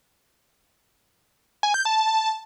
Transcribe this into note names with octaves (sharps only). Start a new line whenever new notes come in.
G#5
G6
A5